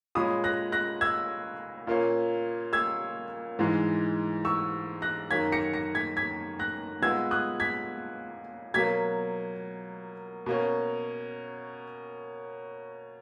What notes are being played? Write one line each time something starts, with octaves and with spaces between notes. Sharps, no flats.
A#2 G#3 C#4 B5 D#6
F#6 A#6
F#6 A#6
E6 G#6
A#2 A#3 C#4
E6 G#6
G#2 E3 G#3
C#6 E6
F#6 A#6
F#2 D#3 A#3 C#4 G#6 B6
A#6 C#7
A#6 C#7
G#6 B6
G#6 B6
F#6 A#6
A#2 G#3 B3 E6 G#6
D#6 F#6
G#6 B6
B2 F#3 A#3 G#6 B6
B2 A#3 C#4